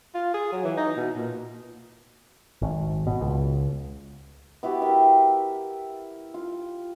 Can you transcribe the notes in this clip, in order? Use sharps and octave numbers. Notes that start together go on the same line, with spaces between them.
F4
G#4
F#3
E3
D#4
B2
A#2
G#1
B2
C#2
B3 E4 F#4 G4
A#4 E5 G5
F4